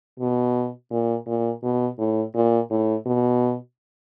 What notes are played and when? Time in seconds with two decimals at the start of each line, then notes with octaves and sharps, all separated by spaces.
0.19 B2
0.91 A#2
1.27 A#2
1.63 B2
1.99 A2
2.34 A#2
2.70 A2
3.06 B2